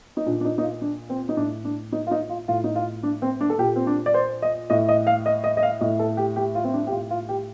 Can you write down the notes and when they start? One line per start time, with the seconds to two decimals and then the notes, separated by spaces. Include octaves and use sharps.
0.17 D#4
0.26 A#2 D4
0.41 D4
0.45 D#4
0.58 D#4
0.63 F4
0.82 D4
1.10 C4
1.29 D#4
1.37 A2 D4
1.65 D4
1.92 D#4
2.07 F4
2.11 D#4
2.30 F4
2.48 A2 F4
2.64 D#4
2.76 F4
3.03 D4
3.22 C4
3.41 D4
3.50 A4
3.59 A#2 G4
3.76 C4
3.87 D4
4.06 D5
4.14 C5
4.42 D#5
4.70 A2 D#5
4.89 D#5
5.07 F5
5.26 D#5
5.44 D#5
5.57 D#5
5.63 F5
5.81 A2 D#5
5.99 A4
6.17 G4
6.36 G4
6.55 F4
6.64 C4
6.74 D4
6.87 G4
6.92 A2 F4
7.10 F4
7.29 G4